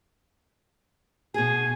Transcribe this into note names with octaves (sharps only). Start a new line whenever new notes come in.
B2 G#4 G#5